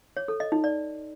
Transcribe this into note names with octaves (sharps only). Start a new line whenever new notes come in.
C#5
A4
D#5
D#4
D5